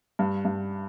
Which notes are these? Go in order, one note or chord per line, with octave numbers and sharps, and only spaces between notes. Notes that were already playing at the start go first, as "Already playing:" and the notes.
G2
G2